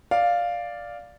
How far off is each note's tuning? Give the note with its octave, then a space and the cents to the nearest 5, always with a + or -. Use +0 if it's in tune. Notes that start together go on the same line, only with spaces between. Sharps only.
D5 +0 F5 +0